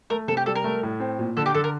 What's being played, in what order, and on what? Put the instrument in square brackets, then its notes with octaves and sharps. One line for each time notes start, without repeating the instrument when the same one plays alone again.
[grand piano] A3 [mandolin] A#4
[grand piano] C3 [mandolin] A4
[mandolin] G4
[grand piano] G3 [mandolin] A4
[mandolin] A#4
[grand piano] A3
A2
C4
A#2
[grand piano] D3 [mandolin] A4
[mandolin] G4
[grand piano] D3 [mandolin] A4
[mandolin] A#4